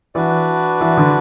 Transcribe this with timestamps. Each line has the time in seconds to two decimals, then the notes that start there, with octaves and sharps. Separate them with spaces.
0.15 E3 D4 F#4 B4 D5
0.81 E3
0.97 D3